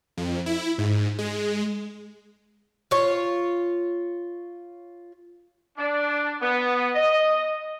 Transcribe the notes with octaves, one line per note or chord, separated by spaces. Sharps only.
F2
E4
G#2
G#3
F4 C#5
D4
B3
D#5